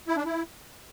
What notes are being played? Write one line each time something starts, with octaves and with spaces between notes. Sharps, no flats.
E4
D4
E4